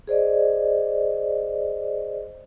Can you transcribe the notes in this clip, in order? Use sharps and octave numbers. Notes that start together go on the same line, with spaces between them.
G#4 C5 D5 D#5